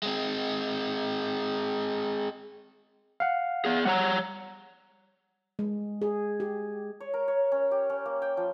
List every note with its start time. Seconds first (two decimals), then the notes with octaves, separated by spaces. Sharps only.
0.03 G#3 C4
3.20 F5 F#5
3.65 B3 G#4
3.85 G3 C#5 F#5 A#5
5.59 G#3
6.02 G#4
6.40 G4
7.00 C#5
7.14 A#4
7.28 C#5
7.52 C#4
7.71 G4
7.90 C#4
8.06 A#3
8.22 G5
8.37 F3